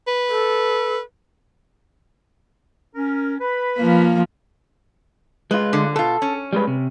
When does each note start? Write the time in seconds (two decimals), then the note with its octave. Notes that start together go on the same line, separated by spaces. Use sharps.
0.07 B4
0.29 A4
2.95 C#4 A#4
3.41 B4 B5
3.78 F3 A#3
5.51 G#3 F4 B4
5.73 D3
5.96 B2 F4 A4
6.22 C#4
6.53 G3 G#3 B4
6.67 C3